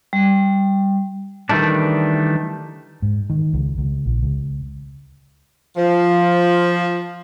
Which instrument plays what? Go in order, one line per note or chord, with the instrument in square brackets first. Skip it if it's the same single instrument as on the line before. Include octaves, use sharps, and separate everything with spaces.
[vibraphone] G3
[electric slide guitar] D#3 E3 G3 A3 D4
[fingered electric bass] G#2
D#3
C#2
C#2
A#1
C#2
[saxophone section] F3